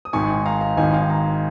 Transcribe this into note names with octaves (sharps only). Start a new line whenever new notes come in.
D#6
G#1 G#2 D#3 G#5 C#6
F5 A#5
F5 A#5
G#1 G#2 D#3 D#5 G#5
F5
G#5
F5 A#5